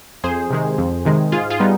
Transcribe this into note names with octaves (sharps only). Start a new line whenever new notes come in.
F2 G#4 C5
C3 D#3 G#3
F2
C3 D#3 G#3
G#2 F4 G#4
F4 G#4
G3 B3 D#4